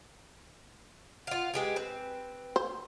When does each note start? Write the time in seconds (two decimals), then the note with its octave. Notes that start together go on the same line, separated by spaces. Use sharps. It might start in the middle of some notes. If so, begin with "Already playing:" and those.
1.27 F4 F5 F#5
1.54 G#3 G4 G#4 B4
1.76 C4
2.56 C5